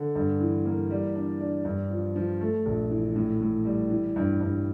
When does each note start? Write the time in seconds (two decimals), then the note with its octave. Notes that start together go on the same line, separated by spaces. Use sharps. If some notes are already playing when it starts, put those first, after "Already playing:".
Already playing: D3
0.15 G2
0.40 E3
0.65 A#3
0.90 G3
1.15 D4
1.40 D4
1.65 G2
1.90 F3
2.16 F3
2.41 A3
2.66 A#1
2.91 E3
3.16 A2
3.41 A2
3.65 G3
3.90 E3
4.16 G2
4.41 G2